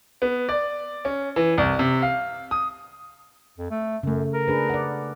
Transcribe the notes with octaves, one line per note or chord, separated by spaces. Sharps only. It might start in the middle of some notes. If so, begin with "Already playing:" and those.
B3
D5
C#4
E3
C2
C3
F5
D#6
F2
A3
F#2 C#3 A3
A#4
D4 G#4 B4
D5 F#5